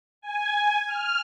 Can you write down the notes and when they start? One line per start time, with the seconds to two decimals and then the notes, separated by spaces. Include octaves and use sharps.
0.21 G#5
0.86 F6